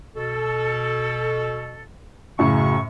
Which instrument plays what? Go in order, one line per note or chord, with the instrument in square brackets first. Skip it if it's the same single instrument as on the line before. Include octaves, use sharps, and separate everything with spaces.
[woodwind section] B2 A4
[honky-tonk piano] F#2 A2 [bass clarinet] C#3 [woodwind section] C#6